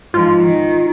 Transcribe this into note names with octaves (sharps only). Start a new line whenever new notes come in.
G#2 F3 F4
D#3